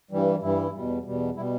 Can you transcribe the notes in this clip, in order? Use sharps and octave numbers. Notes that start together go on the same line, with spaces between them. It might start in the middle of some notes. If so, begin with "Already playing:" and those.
G2 E3 G3
G2 E3 G3 E4
E2 B2 G3
E2 B2 G3
B2 G3 E4